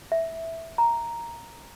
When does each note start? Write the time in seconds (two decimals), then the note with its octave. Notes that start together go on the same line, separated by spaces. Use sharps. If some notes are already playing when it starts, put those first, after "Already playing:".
0.12 E5
0.78 A#5